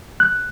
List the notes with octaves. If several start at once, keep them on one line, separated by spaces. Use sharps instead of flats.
F#6